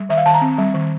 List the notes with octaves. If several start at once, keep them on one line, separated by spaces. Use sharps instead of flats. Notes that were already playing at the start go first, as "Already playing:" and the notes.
Already playing: G3
D#3 E5
F5
D#3 A5
A#5
C4
G3
D#3